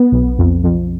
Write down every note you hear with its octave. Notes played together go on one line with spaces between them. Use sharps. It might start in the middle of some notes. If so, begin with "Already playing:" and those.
Already playing: B3
B1
F2
F2